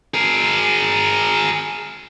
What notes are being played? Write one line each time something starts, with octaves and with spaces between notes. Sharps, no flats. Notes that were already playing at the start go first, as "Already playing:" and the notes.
G#4 A#4